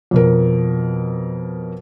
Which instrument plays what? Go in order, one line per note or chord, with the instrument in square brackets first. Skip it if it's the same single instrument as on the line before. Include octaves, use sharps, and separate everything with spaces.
[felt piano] F2 B2 A#4